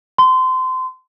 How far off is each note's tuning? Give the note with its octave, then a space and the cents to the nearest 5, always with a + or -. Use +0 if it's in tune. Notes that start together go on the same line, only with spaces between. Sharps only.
C6 -25